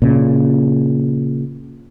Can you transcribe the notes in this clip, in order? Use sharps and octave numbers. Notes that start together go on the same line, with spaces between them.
A#2 C#3